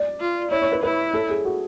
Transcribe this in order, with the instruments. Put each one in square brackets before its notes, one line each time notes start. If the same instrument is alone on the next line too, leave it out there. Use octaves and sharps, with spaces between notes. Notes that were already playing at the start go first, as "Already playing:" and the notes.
Already playing: [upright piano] D5
[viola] F4
[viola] E4 [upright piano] C#5
[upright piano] C#5
B4
[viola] E4 [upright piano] B4
[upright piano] A4
G#4
F#4